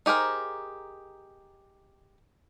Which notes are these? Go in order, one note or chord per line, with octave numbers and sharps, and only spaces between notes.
D#4 G4 G#4 A#4 C5